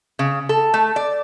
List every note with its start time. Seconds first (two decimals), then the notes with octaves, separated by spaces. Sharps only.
0.19 C#3
0.49 A4
0.74 A3
0.96 D5